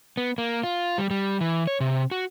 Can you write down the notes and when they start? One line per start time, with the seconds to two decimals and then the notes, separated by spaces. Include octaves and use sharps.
0.17 B3
0.38 A#3
0.63 F4
0.98 G3
1.11 G3
1.41 E3
1.67 C#5
1.80 C3
2.11 F#4